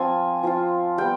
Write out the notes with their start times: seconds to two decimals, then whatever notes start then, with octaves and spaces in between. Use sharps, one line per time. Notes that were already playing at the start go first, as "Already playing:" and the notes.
Already playing: F3 C4 F4 G#5
0.43 F3 C4 F4
0.98 G3 B3 G5